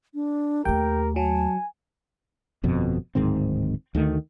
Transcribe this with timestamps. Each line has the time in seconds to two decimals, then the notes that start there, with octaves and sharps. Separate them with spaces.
0.14 D4
0.65 D#2 A3 G4 A#4 G5
1.16 F#3 G#5 A5
2.63 G1 F2 B2
3.15 D1 G#2 D#3 C4
3.95 D2 D#3 A3